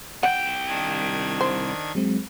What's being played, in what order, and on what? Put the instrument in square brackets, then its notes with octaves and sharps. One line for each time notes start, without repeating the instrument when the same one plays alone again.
[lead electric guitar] C2 G5 [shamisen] F#5
[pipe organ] D#3 D4 G#6
[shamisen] C5
[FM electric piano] F#3 G#3 C4